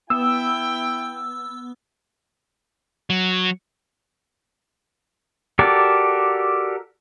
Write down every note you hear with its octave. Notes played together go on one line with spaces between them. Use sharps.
B3 E4 G5 E6
F#3
F#4 G4 A4 A#4 D5